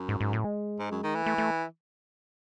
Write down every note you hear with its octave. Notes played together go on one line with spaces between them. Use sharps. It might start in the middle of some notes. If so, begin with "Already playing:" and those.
Already playing: F#2
G#2
G#2
A2
G#3
G#2
F#2
D#3
E3 A3
A3
A3